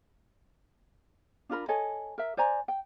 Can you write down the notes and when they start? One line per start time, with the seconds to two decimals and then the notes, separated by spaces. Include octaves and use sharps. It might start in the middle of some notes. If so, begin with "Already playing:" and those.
1.49 D4 F4 A#4 B5
1.68 A4 C#5 D#5 G#5
2.18 A#4 E5
2.37 C5 D5 G#5 A#5
2.68 G5